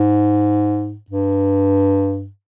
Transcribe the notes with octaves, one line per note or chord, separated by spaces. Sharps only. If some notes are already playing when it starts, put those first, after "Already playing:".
Already playing: G#2
G2